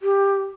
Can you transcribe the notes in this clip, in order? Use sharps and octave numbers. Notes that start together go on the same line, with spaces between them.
G4